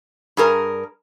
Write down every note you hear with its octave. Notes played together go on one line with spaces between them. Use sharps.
G2 G#4 A#4